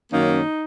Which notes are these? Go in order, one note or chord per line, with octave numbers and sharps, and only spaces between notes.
F#2 D#3 F#3 A#3 C#4 D#4